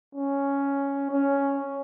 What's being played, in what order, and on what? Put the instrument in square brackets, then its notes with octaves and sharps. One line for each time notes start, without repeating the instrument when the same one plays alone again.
[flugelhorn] C#4
C#4